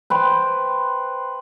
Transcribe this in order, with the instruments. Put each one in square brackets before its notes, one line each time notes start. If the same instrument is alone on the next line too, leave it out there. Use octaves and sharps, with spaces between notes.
[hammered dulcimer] B4 C5 G5